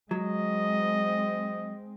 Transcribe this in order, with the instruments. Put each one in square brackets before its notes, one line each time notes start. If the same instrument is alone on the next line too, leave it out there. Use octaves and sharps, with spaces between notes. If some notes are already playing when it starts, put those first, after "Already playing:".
[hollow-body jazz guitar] F#3 [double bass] G#3 C4 [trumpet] D#5